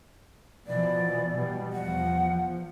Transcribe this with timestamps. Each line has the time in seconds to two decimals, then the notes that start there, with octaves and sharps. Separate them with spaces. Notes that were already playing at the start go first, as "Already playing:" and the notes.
0.67 B2 E3 F3 D5
1.36 B2 G3
1.73 E2 F3 F#5